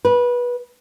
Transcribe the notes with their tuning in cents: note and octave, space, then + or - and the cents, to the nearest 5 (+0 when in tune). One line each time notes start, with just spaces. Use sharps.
B4 -20